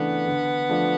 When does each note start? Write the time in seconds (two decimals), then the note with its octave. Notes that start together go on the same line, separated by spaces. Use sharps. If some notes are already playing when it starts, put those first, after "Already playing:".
Already playing: C#3 E3 A3 B3 D4
0.27 D3
0.69 F3 A3 D4